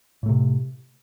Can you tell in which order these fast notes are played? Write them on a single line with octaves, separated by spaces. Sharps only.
A2 A3 C3